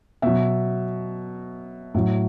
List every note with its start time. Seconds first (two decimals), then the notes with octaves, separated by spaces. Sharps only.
0.22 B2 F#3 E5
1.94 A2 F#3